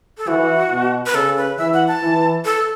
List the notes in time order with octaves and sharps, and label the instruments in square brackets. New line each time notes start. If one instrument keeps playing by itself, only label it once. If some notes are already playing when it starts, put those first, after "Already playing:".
[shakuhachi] A4
[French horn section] E3 [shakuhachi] F#4
[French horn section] B2
[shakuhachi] B4
[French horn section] C#3 [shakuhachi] A4
[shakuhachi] B4
[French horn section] E3 [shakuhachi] E5
[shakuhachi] F#5
A5
[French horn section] E3
[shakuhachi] A4